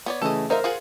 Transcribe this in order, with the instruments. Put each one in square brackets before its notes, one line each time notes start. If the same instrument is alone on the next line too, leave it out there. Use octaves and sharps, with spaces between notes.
[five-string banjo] B3 C#5 D5
[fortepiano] C#3 E3 A3 [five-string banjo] A4 D#5
[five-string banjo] D#4 F4 E5 [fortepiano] A#4 C5
[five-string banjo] F4 G#4 F#5